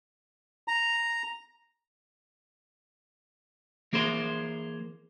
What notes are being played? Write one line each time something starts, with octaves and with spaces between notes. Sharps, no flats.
A#5
E3 A#3 G#4 A#4 C5